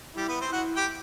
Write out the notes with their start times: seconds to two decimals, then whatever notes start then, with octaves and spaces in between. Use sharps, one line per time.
0.16 G3 E4 G4
0.29 B3 B4
0.41 C4 C5
0.52 E4 F#4 F#5
0.76 G4 G5